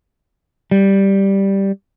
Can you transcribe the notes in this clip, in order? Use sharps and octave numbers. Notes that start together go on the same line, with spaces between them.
G3